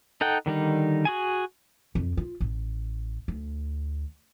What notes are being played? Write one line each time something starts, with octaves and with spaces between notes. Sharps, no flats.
D#4 A4 F#5 G5
D3 D#3 G3 D#4
F#4 G#4 G#5
F2
F4
A1
D2